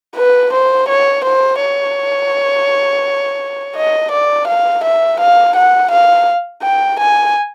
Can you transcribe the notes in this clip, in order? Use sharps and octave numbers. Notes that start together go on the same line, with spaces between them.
B4
C5
C#5
C5
C#5
D#5
D5
F5
E5
F5
F#5
F5
G5
G#5